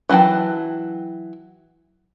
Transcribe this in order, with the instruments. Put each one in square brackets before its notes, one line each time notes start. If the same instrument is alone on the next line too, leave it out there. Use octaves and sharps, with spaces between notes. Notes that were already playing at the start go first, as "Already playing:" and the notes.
[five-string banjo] E3 F#3 E4 G5 A5